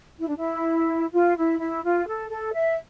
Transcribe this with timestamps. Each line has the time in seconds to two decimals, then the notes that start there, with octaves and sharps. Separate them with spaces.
0.20 E4
0.28 D4
0.37 E4
1.13 F4
1.37 E4
1.60 E4
1.84 F4
2.07 A4
2.30 A4
2.54 E5